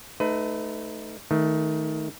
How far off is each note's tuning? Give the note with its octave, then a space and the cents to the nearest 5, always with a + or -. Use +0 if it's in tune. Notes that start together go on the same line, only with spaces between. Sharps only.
A3 -10 D#4 +0 B4 +25
D#3 +15 A3 +0